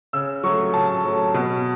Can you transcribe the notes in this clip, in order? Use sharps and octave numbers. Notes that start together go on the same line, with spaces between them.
C#3 E6
F#3 A3 C#6
C#3 A5
F#3 A3
B2